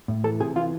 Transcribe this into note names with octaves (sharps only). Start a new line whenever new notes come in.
A2
E3 A4
C3 G#4
E3 F4